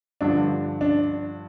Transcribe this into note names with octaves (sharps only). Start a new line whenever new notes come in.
G2 D3 F3 D4
D4